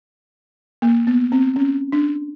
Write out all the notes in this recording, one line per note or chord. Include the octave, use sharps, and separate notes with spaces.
A#3
B3
C4
C#4
D4